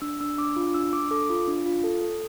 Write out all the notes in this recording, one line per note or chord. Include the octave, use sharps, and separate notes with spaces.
D4 E6
D4 E6
D4 D6
F4
D4 E6
D4 D6
A4 D6
F4
D4
F4
A4
A4